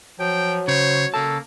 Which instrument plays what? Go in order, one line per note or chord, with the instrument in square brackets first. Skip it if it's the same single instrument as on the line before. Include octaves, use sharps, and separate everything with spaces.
[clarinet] F3 [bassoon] F#3 [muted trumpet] G5
[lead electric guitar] C#3 [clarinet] C5 [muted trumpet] C#5
[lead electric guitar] C#3 A5 [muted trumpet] A#3 [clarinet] A4